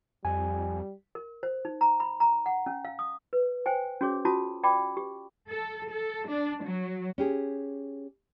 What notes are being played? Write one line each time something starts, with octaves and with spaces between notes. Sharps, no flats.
F2 G3 G#5
A#4
C5
D#4
A#5
B5
A#5
F#5
C#4
F5
D#6
B4
C5 G5 G#5
C#4 F#4 G#4 C#5 D6
C#4 F4 F#4 A5 D#6
D5 G5 A5 B5 D6
G4
A4
A4
D4
F#3
C#4 G4 G#4